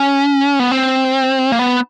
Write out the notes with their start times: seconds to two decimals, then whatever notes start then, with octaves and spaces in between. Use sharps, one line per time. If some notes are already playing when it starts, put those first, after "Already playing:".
Already playing: C#4
0.59 B3
0.71 C4
1.52 A#3
1.59 B3